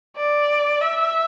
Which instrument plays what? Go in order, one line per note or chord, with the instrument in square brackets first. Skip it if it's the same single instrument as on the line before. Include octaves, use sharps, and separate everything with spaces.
[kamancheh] D5
E5